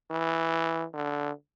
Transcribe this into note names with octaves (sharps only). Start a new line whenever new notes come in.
E3
D3